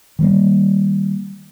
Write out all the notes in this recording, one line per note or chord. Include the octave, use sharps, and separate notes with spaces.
D#3 G3 A#3